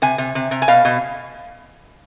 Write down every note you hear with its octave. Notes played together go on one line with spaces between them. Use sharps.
C3 G#5
C3
C3
C3
G#5
B2 F5
B2